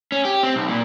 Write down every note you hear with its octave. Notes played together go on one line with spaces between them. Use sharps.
C#4
G4
C4
B1
A#2